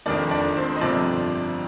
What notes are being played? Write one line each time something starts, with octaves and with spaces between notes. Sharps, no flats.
F1 F2 D#3 D4 D5
D4 D5
C4 C5
D#5
G1 F2 C3 F3 D4 D5